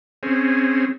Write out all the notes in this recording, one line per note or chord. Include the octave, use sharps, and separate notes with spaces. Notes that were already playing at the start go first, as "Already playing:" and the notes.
C4 C#4 G#4